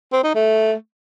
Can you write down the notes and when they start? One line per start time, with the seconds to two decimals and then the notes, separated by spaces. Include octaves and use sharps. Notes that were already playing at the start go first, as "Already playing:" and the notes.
0.13 C4
0.24 D#4
0.35 A3